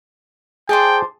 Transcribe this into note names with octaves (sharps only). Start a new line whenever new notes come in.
G#4 C5 D5 G5 A5